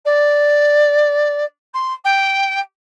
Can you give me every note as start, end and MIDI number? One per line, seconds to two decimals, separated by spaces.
0.05 1.44 74
1.74 1.93 84
2.04 2.60 79